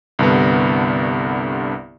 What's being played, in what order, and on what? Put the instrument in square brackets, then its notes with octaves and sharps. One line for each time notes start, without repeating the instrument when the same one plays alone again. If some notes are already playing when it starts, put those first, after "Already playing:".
[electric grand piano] C2 G2 D3 B3